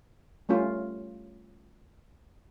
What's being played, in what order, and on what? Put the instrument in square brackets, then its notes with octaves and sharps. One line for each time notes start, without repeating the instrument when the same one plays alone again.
[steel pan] G3 A3 C#4 F4